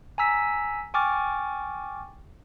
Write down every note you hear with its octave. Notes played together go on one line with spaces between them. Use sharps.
G#5 A#5 E6 B6
G5 G#5 C#6 D6 F6 A6